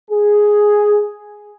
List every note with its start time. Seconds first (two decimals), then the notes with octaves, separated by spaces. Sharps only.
0.10 G#4